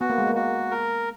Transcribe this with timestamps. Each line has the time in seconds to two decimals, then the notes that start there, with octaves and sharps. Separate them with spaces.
0.01 B3 F#4
0.10 A#3
0.18 G#3
0.27 A#3
0.35 F#4
0.71 A#4